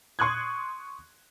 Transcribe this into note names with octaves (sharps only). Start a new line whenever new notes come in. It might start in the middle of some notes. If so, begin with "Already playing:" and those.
C6 C#6 D#6 F#6 G#6